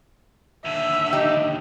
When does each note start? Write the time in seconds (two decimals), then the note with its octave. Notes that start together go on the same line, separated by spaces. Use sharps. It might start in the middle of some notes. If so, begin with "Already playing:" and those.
0.65 D#2 D3 E5
1.13 D#4 G4 D#5